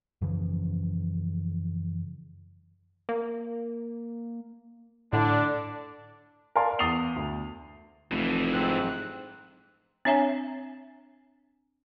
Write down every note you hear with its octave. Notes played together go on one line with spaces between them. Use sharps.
F#2 C#3 E3 F3
A#3
A2 D3 D4
A#4 D5 F5 G#5 A5 C6
E2 D#6 A6 C7 F7 G7
D2
F1 F2 E3
G#2 C4 F#6
C4 D4 C#5 E5 G#5 A#5